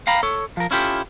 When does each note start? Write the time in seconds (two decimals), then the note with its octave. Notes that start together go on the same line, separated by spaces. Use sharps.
0.07 F5 G5 A#5 B5
0.23 A4 C#5
0.57 F3 A#4
0.71 C#4 E4 F4 G4 A4